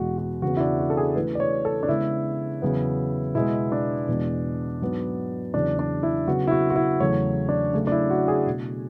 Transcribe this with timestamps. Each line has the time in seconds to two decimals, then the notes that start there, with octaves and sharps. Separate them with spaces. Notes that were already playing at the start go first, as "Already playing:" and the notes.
Already playing: E2 B2 G#3 F#4
0.18 F#4
0.42 E2 C#3 E3 B3 F#4
0.57 E4
0.60 D4
0.79 F#4
0.90 A4
0.97 G#4
1.15 C#3 E3 A3 B4
1.35 D5
1.40 C#5
1.65 A4
1.83 D4
1.89 C#3 G#3 B3 E4
2.62 E2 C#3 F#3 B3
3.35 B2 G#3 B3 E4
3.72 D4
4.08 E2 B2 G#3 B3
4.81 G#2 F#3 B3
5.54 E2 C#3 F#3 B3 D4
5.79 D4
6.03 E4
6.27 C#3 F#3 B3 F#4
6.47 E4
6.51 F#4
6.70 F#4
6.76 E4
7.00 E2 C#3 F#3 A3 C#5
7.49 D4
7.73 C#3 F#3 A3
7.87 D4
7.92 E4
8.10 F#4
8.28 G#4
8.47 B2 A3